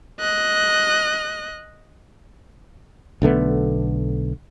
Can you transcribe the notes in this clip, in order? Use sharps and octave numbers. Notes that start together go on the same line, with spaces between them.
D#5 F#6
B1 D3 A3 B3